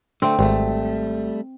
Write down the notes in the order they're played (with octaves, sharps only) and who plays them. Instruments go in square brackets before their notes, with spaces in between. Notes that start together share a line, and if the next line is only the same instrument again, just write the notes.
[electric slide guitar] D3 A3 [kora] C4
[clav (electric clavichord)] G#1 [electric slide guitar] G3 A3